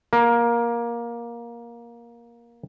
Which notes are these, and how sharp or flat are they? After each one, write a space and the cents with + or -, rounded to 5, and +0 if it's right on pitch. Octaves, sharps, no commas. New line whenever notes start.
A#3 +15